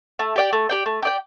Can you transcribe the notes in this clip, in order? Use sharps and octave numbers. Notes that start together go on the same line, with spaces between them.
A3
G4 D5 G5
A3
G4 D5 G5
A3
G4 D5 G5